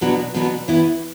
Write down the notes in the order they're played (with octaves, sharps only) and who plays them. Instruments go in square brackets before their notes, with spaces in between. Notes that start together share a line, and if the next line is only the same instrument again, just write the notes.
[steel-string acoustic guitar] B2 F#3 B3 D4 F#4
B2 F#3 B3 D4 F#4
E3 B3 E4